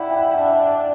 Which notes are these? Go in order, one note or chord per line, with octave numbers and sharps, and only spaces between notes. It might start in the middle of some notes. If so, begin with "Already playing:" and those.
Already playing: E4 D5 F#5 G5
G5
F#5
D4 E5
D5